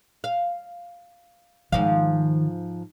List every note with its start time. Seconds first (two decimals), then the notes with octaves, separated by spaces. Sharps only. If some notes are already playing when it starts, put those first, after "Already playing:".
0.24 F5
1.72 G#2 D#3 F3 F5